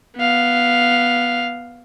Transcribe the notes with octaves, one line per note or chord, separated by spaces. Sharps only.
B3 F5